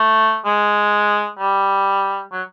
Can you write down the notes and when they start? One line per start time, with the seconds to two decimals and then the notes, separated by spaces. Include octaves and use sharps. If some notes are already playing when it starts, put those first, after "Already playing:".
Already playing: A3
0.45 G#3
1.39 G3
2.32 F#3